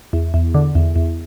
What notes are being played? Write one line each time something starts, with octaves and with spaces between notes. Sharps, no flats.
E2
E2
D3
E2
E2